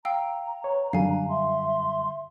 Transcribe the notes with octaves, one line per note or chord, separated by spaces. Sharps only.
F5 G5 A#5 E6
B4 C#5
F#2 D3 G3 D4 F5 G#5
E5 C6